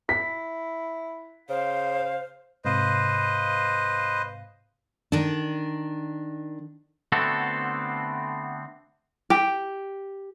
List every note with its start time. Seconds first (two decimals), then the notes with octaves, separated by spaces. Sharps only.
0.09 E4 B6
1.49 C#3 C5 F5
2.65 G#2 C3 B4 C5 D#5 F5
5.12 D#3 D4
7.12 D3 A3 B3 C4 F#4 A4
9.30 G4